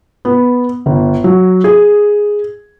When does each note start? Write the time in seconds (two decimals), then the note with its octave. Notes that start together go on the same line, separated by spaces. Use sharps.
0.25 B3
0.86 G1
1.24 F#3
1.64 G#4